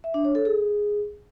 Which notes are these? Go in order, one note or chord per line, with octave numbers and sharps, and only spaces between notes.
E5
D4
C#5
A4
G#4